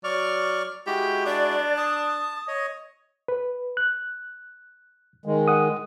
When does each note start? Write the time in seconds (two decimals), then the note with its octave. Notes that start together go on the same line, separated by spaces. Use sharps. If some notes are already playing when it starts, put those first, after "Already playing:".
0.04 F#3 D5 C#6 F6
0.87 G#3 E4 F#4 G4
1.26 D4 D5
1.77 A5 D#6
2.48 C#5 D#5
3.28 B4
3.77 F#6
5.26 D#3 G#3
5.48 F#5 D#6